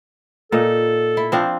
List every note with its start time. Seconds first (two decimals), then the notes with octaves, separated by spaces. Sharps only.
0.52 A#2 D#4 A4
1.17 E4
1.32 F3 C4 D4